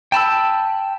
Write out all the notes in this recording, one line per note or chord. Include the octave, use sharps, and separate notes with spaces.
G5 A5 B5 E6